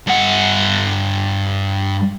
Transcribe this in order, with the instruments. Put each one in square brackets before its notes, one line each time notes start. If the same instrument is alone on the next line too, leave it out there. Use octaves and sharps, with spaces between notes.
[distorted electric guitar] G2 F#5